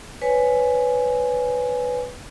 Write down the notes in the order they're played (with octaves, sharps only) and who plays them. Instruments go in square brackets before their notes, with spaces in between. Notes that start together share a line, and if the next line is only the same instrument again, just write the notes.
[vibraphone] B4 C#5 G#5